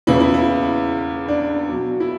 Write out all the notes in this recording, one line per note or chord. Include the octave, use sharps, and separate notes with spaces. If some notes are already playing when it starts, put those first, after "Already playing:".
E2 C#3 E3 E4
E4
E4
D4
B2 F#3
E4